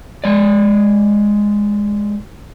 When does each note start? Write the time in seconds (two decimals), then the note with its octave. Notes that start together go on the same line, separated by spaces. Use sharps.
0.24 G#3 D5